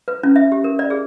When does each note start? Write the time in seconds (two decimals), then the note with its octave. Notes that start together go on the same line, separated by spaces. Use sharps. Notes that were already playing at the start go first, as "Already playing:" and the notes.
0.08 B4
0.23 C#4
0.36 E5
0.52 G4
0.64 A#4
0.79 D5
0.90 G#4